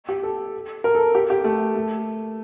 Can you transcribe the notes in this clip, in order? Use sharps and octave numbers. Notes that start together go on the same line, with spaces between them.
G4
A4
A#4
A4
G4
G4
A3
A3